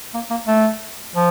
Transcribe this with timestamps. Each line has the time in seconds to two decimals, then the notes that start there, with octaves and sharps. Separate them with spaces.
0.14 A#3
0.30 A#3
0.47 A3
1.16 F3